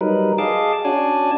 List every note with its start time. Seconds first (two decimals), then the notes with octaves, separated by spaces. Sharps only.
0.01 F#3 G3 D#4 A#4 B4
0.38 G#4 D#5 F5 A5 D6
0.85 C#4 D4 F#4 D5 G#5 A5